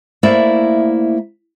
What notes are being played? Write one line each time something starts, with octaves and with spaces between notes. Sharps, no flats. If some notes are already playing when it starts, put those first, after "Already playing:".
A3 A#3 E4 C5 D5 E5